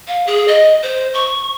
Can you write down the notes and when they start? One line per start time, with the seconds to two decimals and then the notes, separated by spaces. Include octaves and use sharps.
0.08 F5
0.27 G#4
0.48 D#5
0.83 C5
1.14 C#6